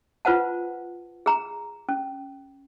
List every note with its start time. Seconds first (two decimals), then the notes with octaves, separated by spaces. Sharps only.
0.25 F4 B4 C5 F#5 A5
1.26 G#4 A#5
1.89 C#4